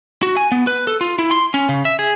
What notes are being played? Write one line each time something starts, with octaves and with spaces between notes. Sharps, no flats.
F#4
G#5
B3
B4
A4
F4
E4
C6
C#4
C#3
E5
G#4